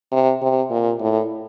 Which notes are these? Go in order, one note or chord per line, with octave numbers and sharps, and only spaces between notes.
C3
C3
A#2
A2